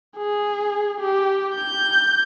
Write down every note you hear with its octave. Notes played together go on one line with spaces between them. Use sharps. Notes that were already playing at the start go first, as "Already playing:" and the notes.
G#4
G4
G6